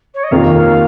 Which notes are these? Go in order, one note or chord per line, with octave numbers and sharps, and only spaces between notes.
C#5
D#5
F1 D#2 D#3 A#3 F4 F5